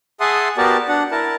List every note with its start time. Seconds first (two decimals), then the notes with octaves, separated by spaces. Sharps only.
0.20 G#4 E5 F#5 A5 C6 D#6
0.57 B3 F#4 G4 A#4 D5 A5
0.89 D4 F#5
1.11 E4 A#4 A5